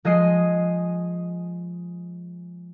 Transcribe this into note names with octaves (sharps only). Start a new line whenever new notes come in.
F3 G#3 G#4 D#5 D#6 C7